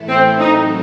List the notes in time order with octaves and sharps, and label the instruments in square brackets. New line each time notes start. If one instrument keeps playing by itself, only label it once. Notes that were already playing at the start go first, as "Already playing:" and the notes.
Already playing: [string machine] A2 E3 A3 E4 A4
[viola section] C4
[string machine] F#3 C4 F#4 A4 [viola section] D#4